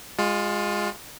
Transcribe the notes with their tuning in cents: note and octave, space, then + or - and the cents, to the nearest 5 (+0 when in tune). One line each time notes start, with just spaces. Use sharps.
G#3 -15 F4 +20